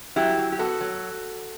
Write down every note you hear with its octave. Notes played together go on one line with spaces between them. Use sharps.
F#3 E4 G4
F#3
G4
B3 F#4 A4
F#3